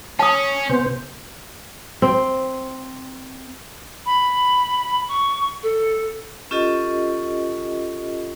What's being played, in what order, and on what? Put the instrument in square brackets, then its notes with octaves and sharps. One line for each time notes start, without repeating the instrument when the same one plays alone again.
[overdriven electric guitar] C#4 [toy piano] A5 D#6
[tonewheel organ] C3 B3 C5
[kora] C4
[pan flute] B5
C#6
A4
[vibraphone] C#4 F4 G4 A4 D#5